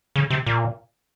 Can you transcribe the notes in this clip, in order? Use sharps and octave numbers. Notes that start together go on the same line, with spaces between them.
C#3
C3
A#2